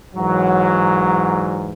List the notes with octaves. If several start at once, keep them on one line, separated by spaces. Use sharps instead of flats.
G#2 E3 F#3